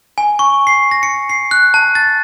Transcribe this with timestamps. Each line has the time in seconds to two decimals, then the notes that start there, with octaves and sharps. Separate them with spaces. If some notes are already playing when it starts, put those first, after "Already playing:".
0.18 G#5
0.39 C#6
0.67 C7
0.91 A#6
1.03 C#7
1.29 C7
1.51 F#6
1.74 A5
1.95 A6